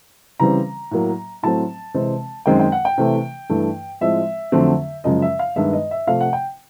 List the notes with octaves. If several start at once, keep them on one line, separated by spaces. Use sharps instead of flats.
C#3 E3 G3 C4 A#5
A2 F#3 A#3
A2 F#3 A3 C4 A5
C3 E3 G#3 C4
F#2 D#3 G#3 C4 G5
G5
F#5
G5
C3 E3 A3
G2 E3 A3
A2 F3 G#3 C4 E5
F2 D3 F#3 A3 C4
F#2 C#3 F3 G#3 D#5
E5
F5
G2 D#3 G#3 B3 E5
D#5
E5
C3 F3 A3 F5
F#5
G5